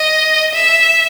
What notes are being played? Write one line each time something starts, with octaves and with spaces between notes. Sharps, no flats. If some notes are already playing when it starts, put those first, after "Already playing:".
Already playing: D#5
E5